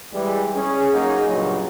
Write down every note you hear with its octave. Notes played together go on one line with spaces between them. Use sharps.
E3 G3 G#3
C#4 G#4
F#3 A#3 D#4 F#4 G#4
G2 A#2 C#3 F#3